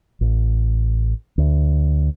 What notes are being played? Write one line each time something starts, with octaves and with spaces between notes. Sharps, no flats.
A1
D2